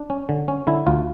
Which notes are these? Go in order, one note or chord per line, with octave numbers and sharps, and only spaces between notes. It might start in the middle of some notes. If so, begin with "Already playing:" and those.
Already playing: D4
C#4
D3
C#4
D3 E4
D2 F4